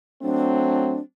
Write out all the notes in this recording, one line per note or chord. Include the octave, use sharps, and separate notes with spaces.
F#3 A3 C4 D4